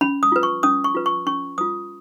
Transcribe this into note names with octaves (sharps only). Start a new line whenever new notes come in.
C#4 B5
D#6
F4 B4
C#6
C#4 D#6
C#6
F4 B4
C#6
C#4 C#6
F4 B4 D#6